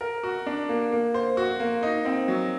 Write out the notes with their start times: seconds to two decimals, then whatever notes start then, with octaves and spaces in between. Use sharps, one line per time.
0.01 A#4
0.23 F#4
0.46 D4
0.69 A#3
0.92 A#3
1.14 C5
1.37 F#4
1.60 A#3
1.83 D#4
2.05 C4
2.28 F#3